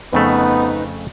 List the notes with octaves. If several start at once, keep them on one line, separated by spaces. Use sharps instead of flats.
F2 C#3 A3 B3 D#4 B4